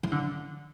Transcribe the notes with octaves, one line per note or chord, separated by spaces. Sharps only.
E3
D3